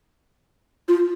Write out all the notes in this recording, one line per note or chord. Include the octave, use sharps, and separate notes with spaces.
F4